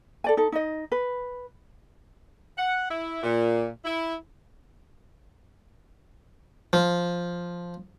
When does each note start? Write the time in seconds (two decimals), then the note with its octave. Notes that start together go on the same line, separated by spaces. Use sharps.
0.24 A4 D5 G#5
0.37 D#4 A4
0.52 D#4 D#5
0.92 B4
2.57 F#5
2.89 E4
3.23 A#2
3.85 E4
6.73 F3